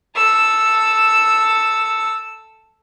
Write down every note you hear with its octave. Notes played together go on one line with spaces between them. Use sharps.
A4 E6